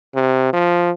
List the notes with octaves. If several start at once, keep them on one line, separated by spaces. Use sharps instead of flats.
C3
F3